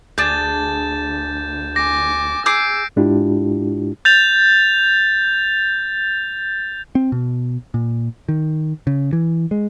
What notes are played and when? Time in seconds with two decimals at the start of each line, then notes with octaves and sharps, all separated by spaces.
0.18 D2 D4 G#4 G6 A6 E7
1.76 G#5 D6 A#6
2.46 G#4 D6 E6 G6 C7 D7
2.96 G#2 G#3 D4 E4 F4 G4
4.05 G6 A6 F7
6.95 C4
7.12 B2
7.74 A#2
8.29 D#3
8.87 C#3
9.13 E3
9.51 G#3